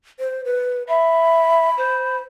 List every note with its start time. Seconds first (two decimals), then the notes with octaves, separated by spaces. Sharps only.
0.20 C5
0.45 B4
0.88 E5 B5
1.77 C5